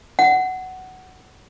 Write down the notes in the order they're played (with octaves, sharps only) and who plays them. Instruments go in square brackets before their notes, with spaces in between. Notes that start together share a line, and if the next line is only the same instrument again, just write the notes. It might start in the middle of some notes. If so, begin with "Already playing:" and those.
[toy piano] F#5